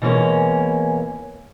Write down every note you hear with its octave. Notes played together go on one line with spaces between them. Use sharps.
B2 E3 G#3 A#3 C#4